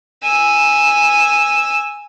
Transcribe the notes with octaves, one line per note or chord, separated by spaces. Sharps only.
G#5 E6